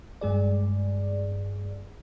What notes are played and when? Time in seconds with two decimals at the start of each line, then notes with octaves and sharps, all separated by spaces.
0.21 G2 G#3 G#4 D5